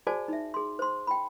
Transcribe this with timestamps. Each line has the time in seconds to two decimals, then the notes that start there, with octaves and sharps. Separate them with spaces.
0.07 F#4 G#4 C5 D5 G#5 A5
0.28 D#4 E5
0.54 G#4 C6
0.79 C5 C6
1.07 G5 B5